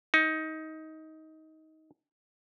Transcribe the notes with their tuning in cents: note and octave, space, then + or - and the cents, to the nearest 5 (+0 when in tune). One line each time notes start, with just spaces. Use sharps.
D#4 +20